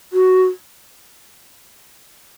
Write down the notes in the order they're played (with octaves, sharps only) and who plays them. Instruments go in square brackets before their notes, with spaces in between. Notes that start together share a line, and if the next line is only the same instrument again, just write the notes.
[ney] F#4